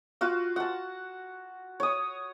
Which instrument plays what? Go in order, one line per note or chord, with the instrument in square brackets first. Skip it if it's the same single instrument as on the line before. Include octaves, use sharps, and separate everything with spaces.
[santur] F4 F#4 F5
F#5 A5
C#5 D#6